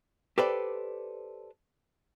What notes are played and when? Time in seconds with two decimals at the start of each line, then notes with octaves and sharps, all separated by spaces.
0.38 G4 A4 B4 C5 D5